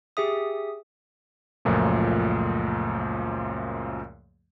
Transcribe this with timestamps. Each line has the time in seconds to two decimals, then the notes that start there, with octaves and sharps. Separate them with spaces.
0.17 G4 G#4 E5 D#6
1.65 C#2 F#2 A#2 F3 A3